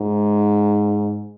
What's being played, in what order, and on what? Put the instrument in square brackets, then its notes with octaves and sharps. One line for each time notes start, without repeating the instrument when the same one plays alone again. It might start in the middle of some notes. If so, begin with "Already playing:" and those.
Already playing: [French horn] G#2